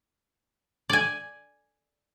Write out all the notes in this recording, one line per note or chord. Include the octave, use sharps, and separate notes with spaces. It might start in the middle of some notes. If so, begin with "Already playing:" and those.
D5 G#5